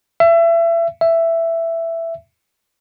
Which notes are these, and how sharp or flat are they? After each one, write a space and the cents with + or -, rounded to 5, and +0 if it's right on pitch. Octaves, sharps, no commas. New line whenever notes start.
E5 +30
E5 +10